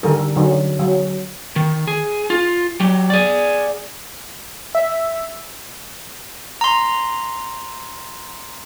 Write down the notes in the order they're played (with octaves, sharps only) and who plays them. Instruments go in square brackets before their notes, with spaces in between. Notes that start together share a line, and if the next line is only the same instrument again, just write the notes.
[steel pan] D3 D#3 G3 A4 A#4
D3 F#3 D#4
F#3
[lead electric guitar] D#3
G#4
F4
F#3 G4
G#4 D5
[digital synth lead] E5
[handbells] A#5 C6